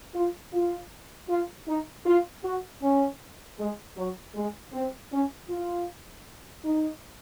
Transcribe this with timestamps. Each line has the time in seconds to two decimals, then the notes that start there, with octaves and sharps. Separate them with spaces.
0.14 F4
0.53 F4
1.29 F4
1.67 D#4
2.05 F4
2.44 F#4
2.82 C#4
3.58 G#3
3.96 F#3
4.35 G#3
4.73 C4
5.11 C#4
5.49 F4
6.64 D#4